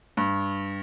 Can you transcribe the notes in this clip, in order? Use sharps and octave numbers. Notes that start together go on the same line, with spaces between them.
G2